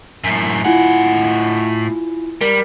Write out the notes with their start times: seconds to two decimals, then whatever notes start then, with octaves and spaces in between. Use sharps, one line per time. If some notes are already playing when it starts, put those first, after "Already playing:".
0.24 F#2 A2
0.65 A2 E4 F4 F#5 G#5
2.41 G3 A#4